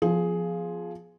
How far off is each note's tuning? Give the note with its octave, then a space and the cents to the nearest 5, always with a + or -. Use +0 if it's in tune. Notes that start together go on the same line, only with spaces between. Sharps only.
F3 +0 B3 +0 G#4 +10